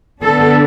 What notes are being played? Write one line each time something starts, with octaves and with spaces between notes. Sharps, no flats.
D3 B3 D4 A4